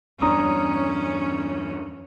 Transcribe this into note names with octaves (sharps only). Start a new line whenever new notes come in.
E2 G2 C#4 D4 A#5 D#6